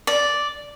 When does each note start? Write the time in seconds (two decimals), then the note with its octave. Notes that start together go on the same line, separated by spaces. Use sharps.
0.07 D5